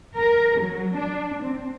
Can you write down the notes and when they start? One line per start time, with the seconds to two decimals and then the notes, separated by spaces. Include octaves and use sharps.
0.16 A#4
0.60 F#3
0.97 D4
1.43 C4